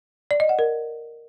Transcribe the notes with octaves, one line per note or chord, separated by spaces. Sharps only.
D5
D#5
F#5
A#4